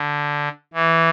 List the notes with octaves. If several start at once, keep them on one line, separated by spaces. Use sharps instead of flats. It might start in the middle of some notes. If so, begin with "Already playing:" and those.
Already playing: D3
E3